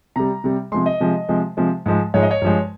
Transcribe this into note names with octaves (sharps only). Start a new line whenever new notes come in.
C3 G3 A#5
C3 G3
C3 F3 G#3 C6
D#5
C3 F3 G#3
C3 F3 G#3
C3 F3 G#3
G#2 F3 G#3
G#2 F3 G#3 C#5
D#5
C#5
G2 F3 G#3